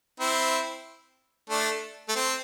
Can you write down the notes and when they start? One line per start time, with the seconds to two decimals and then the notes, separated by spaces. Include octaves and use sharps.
0.20 C4 E4
1.50 A3 D4
2.09 A3
2.16 C4